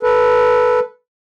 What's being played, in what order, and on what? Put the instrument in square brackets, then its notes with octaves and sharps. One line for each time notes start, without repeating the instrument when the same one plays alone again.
[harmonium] A4 B4